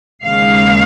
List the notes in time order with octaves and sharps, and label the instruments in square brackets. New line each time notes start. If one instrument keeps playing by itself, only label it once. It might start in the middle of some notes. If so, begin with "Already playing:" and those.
[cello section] D#2 C#3 G#3 F5